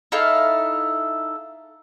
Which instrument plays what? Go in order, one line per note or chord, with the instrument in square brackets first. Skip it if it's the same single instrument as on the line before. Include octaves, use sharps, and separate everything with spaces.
[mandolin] D#4 E4 A4 F5